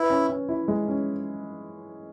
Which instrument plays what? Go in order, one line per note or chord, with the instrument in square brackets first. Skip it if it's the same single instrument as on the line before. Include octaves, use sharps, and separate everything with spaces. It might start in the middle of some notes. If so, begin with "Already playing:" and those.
Already playing: [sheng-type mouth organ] E4 [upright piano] B4
[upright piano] C#4
C#4
E4
G#3
C#4